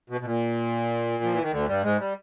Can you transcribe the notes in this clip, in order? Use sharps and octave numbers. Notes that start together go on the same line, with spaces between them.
B2
B2
A#2
F3
E3
D#3
D2 D3
G2 G3
G#2 G#3
G3